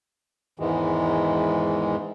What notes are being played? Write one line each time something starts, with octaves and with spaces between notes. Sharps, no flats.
E2 G#2 D#3 E3 G#3